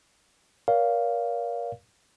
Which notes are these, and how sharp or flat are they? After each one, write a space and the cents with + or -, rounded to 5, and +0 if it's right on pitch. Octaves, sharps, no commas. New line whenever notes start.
A#4 +25 C#5 +45 F5 +0